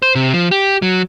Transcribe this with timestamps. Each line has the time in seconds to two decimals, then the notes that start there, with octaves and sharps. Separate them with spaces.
0.02 C5
0.15 C3
0.34 F3
0.51 G4
0.82 F#3